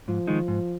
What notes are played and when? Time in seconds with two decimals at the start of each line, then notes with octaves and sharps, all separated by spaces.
0.08 G#2 F3
0.27 D#3 G#3 D#4
0.48 G#2